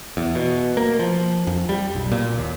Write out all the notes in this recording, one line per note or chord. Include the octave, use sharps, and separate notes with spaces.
E2
B2
A#3
F3
F2
G3
B1
A#2
D#2